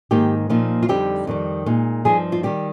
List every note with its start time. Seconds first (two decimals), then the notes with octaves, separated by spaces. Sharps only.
0.11 G#2 D#3 A#3 D#4 G4
0.50 A#2 F3 A#3 D#4
0.83 F4
0.88 F2 D3 G3 C4 D#4 G4
1.27 F2 D#3 G3
1.66 A#2 G#3 D#4
2.05 G2 F3 C4 D#4 G#4
2.32 F4
2.43 D#3 G3 G4